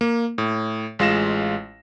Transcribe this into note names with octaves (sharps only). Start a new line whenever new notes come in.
A#3
A2
A1 G#3 F4 F5 A#6 E7